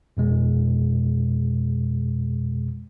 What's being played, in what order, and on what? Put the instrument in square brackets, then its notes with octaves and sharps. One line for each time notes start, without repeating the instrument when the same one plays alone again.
[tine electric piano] F2 B2 G#3